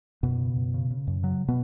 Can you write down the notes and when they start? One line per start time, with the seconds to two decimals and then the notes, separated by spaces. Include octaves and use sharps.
0.23 F#2 B2 B3
0.39 C#3
0.56 F#2
0.74 C#3
0.90 C#3
1.07 F#2
1.23 C#3 F#3
1.48 B2 B3